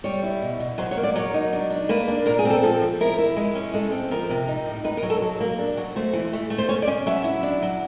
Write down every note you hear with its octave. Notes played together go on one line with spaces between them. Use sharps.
G3 C#5
E4
B2
B2
F#3 C5
C#5
A#3
D5
F#3 C#5
D#4
D4
D4
A#3 B4
D4
A#2 A#4
G#4
C4
A4
F3 A4
F3
E4 A#4
E4
G#3
C#4
G#3 A4
C4
F3 A#4
C3
D#4
A2
D#4 B4
A#4
F#3
A4
F#3
A#3
D4
F#3
A3 C5
E3
A3
A3
C5
C#4 C#5
D5
C#4
F#3 E5
E4
D4
F#3